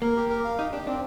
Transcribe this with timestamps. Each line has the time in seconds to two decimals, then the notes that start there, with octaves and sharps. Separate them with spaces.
0.02 A#3 A#4
0.16 G4
0.29 A#4
0.44 F5
0.59 D#4 G4
0.72 D4 G4
0.87 C4 D4